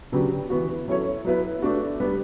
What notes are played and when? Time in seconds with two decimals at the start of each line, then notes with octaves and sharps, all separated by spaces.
0.12 C#3 F#3 B3 D4 G4
0.50 E3 B3 F#4
0.88 F#3 C#4 E4 A4 C#5
1.25 F#3 B3 E4 B4
1.62 A3 D4 F#4
2.00 G3 B3 D4